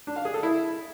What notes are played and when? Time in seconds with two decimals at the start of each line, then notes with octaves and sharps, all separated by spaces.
0.07 D4
0.16 F5
0.25 G#4
0.34 A4
0.43 E4